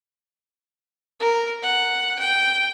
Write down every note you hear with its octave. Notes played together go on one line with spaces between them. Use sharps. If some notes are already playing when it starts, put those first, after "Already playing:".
A#4
F#5
G5